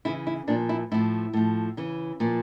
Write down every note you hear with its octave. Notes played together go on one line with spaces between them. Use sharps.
C#3 E3 E4
E4
A#2 F3 D4
E4
A2 F3 E4
A2 F3
C#3 E3
A#2 F3